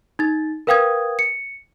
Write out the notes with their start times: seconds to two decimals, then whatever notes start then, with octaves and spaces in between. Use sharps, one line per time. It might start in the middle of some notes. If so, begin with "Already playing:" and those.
0.19 D#4 A6
0.67 A#4 B4 F5 G5 D#6 G#6
1.19 C#7